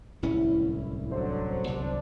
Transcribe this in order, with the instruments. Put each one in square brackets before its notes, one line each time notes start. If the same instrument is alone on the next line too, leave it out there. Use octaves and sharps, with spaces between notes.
[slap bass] D1 C2 C#4 [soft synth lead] E4
[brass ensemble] D3 F#3 [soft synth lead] C5
[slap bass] G1 C2 F#3 [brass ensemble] D4